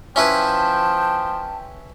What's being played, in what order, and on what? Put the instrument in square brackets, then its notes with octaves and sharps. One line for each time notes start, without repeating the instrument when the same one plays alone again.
[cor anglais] F3 [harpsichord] C#4 E4 B4 [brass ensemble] G5 [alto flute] A5